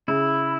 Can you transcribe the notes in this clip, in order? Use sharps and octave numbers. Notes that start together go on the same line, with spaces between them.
C#3 E4